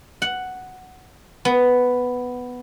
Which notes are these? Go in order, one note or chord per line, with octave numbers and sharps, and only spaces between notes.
F#5
B3